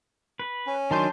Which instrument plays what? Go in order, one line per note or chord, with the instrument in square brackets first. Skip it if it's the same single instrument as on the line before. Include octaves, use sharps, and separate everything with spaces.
[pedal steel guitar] B4
[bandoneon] C#4
[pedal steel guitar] D#3 F#3 D4 [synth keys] A5 C6 G6